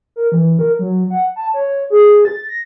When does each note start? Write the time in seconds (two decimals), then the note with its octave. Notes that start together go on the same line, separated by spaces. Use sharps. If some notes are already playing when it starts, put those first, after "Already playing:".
0.16 A#4
0.32 E3
0.59 A#4
0.79 F#3
1.10 F#5
1.36 A5
1.54 C#5
1.90 G#4
2.25 A6
2.49 A#6